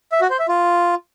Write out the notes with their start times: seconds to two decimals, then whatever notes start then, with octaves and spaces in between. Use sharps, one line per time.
0.12 E5
0.21 F#4
0.30 C5
0.39 E5
0.48 F4